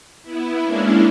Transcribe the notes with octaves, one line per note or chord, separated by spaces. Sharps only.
B3 E4
G#3 A#3 C#4 D4 E4